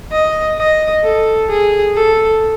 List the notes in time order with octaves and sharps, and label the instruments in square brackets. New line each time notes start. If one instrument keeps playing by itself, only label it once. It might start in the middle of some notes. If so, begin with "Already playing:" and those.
[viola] D#5
D#5
A4
G#4
A4